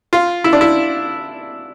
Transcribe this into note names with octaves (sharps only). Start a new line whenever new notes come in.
F4
E4
D4
E4